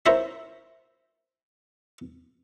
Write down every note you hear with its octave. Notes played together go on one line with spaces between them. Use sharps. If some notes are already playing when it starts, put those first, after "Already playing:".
E4 A#4 C5 C#5 E5